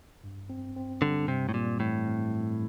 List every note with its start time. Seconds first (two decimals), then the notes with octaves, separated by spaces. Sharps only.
0.24 G2
0.50 C4
0.76 C4
1.02 D3 G3
1.28 G2 C3
1.49 A2
1.54 A#2 G3
1.80 A2 E3
2.07 C4
2.33 G2